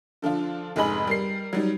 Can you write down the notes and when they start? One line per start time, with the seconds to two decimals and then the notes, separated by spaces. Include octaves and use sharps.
0.22 D3 F3 D4 F4
0.76 F1 G#2 G#4 D#5 B5 F#7
1.07 G3 A#4 C7
1.53 F#3 G3 D#4